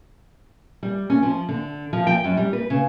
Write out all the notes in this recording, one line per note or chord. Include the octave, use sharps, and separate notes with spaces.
G3
C#4
F3
D3
F3
G5
F#2
G3
B4
C#3